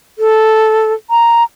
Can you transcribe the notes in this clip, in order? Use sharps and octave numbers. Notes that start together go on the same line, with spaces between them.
A4
A#5